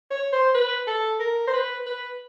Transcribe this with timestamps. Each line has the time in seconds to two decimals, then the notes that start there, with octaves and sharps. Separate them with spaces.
0.11 C#5
0.32 C5
0.54 B4
0.87 A4
1.20 A#4
1.47 C5
1.53 B4
1.86 B4